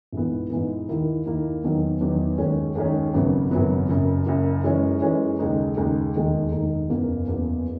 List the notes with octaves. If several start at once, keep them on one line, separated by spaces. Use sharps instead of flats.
A#1 G#2 E3 B3
A#1 G#2 E3 B3
D#2 D#3 A#3 E4
D#2 D#3 A#3 E4
E2 D#3 F#3
E2 D#3 F#3
D#2 D#3 G#3 C#4
D#2 D#3 G#3 C#4
G#1 F#2 C#3 F#3 B3
G#1 F#2 C#3 F#3 B3
F#1 F#2 C#3
F#1 F#2 C#3
F#2 E3 G#3 C#4
F#2 E3 G#3 C#4
D#2 C#3 G#3 D#4
D#2 C#3 G#3 D#4
E1 D#2 D#3 G#3 D#4
E1 D#2 D#3 G#3 D#4
F#1 E2 B2 A#3
F#1 E2 B2 A#3